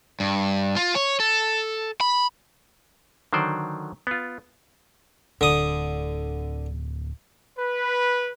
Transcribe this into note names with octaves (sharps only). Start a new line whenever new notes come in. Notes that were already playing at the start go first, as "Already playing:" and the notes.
G2
F4
C#5
A4
B5
D3 D#3 F#3 C5 D5
B3 F4
D1 D3 D#6
B4